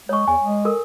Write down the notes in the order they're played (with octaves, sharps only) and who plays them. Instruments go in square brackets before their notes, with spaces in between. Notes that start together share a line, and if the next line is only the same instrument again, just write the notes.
[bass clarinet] G#3 [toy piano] C#5 C#6
[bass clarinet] E2 [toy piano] G#5
[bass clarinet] G#3
[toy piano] A4 A#4